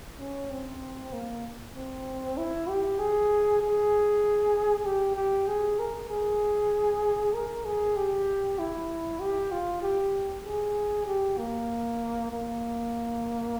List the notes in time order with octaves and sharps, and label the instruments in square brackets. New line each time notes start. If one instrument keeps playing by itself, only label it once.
[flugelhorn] C#4
C4
A#3
C4
E4
G4
G#4
G#4
G4
G4
G#4
A#4
G#4
A#4
G#4
G4
E4
G4
F4
G4
G#4
G4
A#3
A#3